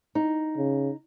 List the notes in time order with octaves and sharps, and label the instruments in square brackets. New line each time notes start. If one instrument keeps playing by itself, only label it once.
[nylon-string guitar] D#4
[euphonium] C#3